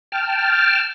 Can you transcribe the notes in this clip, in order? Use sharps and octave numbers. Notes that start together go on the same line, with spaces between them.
G5 A5 F6